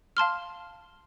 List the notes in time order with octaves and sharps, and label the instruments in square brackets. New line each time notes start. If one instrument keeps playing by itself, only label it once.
[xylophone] F5 A5 C6 F6